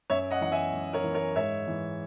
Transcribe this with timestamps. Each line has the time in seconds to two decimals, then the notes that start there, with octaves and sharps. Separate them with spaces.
0.10 F#2 C#5 E5
0.30 D#5 F#5
0.41 E3 F#5
0.52 E5 G#5
0.73 F#2
0.93 A#4 C#5
1.04 E3
1.14 A#4 C#5
1.35 G#2 C#5 E5
1.68 E3